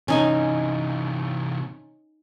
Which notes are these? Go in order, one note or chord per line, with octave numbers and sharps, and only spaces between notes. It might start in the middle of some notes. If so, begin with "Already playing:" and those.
C3 E3 C#4 D#4 G#5